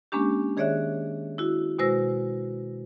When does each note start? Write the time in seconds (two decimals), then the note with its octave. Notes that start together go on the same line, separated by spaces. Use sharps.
0.12 G#3 A#3 C#4 D4 G4
0.57 D#3 G#4 C#5 D5 E5 F#6
1.38 E4 F#4
1.79 B2 G#3 F#4 C5 E6 A#6